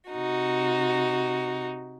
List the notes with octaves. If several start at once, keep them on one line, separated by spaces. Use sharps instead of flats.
C3 D#4 F#4